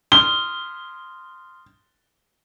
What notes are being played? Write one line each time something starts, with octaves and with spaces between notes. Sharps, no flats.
C6 D#6 F6 G7